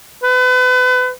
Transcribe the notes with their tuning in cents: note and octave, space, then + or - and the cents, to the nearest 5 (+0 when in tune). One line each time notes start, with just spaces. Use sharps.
B4 +35